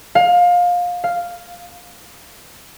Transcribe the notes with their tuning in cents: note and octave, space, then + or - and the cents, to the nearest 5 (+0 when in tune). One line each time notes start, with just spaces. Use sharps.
F5 +25
F5 +0